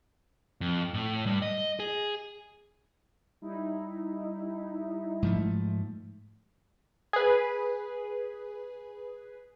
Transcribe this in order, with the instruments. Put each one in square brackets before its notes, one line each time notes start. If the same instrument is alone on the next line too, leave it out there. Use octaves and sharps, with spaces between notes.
[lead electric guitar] F2
A2
G2
D#5
G#4
[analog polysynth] G3 D#4 E4
[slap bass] G#2 F3 A3
[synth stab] G#4 B4